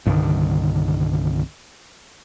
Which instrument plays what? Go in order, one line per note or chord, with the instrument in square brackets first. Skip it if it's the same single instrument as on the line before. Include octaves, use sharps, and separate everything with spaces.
[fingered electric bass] C2 G2 D3 D#3